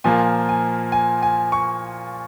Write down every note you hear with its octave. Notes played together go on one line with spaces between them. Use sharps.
A#2 F3 A#3 G#5
G#5
G#5
G#5
C#6